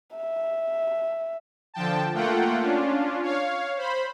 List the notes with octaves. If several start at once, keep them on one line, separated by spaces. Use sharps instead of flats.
E5
D3 F3 G5 A5
A3 A#3 F4 F#5 G5
C#4 D4 F4
C#5 F5
C5 B5